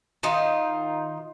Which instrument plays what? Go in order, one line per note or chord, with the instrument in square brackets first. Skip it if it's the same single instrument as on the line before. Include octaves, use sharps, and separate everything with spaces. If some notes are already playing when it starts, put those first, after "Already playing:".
[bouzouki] D#3 D#4 F4